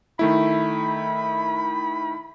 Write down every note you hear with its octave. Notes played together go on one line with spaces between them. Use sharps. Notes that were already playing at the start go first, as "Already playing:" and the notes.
D#3 A3 E4 B5